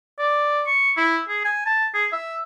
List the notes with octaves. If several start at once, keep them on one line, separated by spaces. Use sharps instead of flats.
D5
C#6
E4
G#4
G#5
A5
G#4
E5